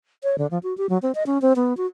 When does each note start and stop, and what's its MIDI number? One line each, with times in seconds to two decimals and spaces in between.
0.23 0.36 73
0.38 0.47 50
0.51 0.59 53
0.63 0.76 66
0.78 0.87 67
0.89 0.98 54
1.02 1.12 60
1.15 1.23 75
1.26 1.40 61
1.42 1.53 60
1.56 1.76 59
1.77 1.86 66